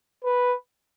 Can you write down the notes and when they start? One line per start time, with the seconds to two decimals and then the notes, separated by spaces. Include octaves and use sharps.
0.24 B4